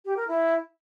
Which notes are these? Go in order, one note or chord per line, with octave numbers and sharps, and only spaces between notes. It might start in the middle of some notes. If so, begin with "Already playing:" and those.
G4
A#4
E4